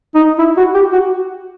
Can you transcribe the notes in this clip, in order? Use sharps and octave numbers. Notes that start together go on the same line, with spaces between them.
D#4
E4
F#4
G4
F#4